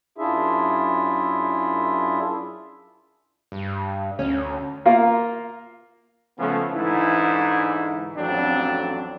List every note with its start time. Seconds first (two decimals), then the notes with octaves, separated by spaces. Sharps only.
0.18 F#2 D4 E4 F4 G#4 E5
3.52 G2
4.19 D2 C#4
4.86 A#3 F4 A#4
6.39 C#3 F3 A3 B3 C#4
6.74 G#2 D3 E3 E4
8.17 A1 F2 F#3 C4 D4